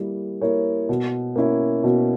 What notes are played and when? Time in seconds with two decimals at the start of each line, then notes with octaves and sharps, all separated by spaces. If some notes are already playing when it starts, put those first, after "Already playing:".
Already playing: G3 A#3 E4 A#4
0.41 A#3 E4 A#4 C#5
0.89 B2
1.36 A#3 C#4 E4
1.84 B2